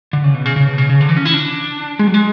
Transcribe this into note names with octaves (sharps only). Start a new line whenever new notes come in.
D3
C#3
B2
C#3
C#3
B2
C#3
C#3
D3
E3
C#4
E4
D4
G#3
F#3
G#3